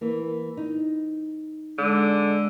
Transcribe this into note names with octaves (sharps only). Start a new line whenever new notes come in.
E3 A#3
D#4
D3 G#3